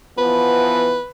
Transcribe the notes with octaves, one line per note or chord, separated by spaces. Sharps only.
E3 F3 B3 B4